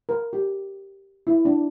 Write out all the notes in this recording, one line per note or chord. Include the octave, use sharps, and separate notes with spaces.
A#4
G4
E4
D4